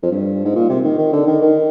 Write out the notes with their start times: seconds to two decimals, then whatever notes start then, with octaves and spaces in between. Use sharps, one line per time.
0.02 F2
0.11 G2
0.44 G#2
0.56 A#2
0.69 C3
0.84 D#3
0.98 D#3
1.12 D3
1.27 D#3
1.42 D#3